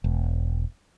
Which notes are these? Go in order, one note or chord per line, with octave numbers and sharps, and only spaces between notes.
E1